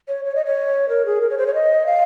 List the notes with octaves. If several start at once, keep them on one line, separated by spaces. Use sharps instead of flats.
C#5
C#5
D#5
C#5
A#4
G#4
A#4
C#5
C5
C#5
D#5
F5